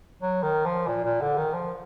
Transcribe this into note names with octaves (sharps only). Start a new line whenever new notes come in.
F#3
D#3
F3
A#2
A#2
D3
D#3
F3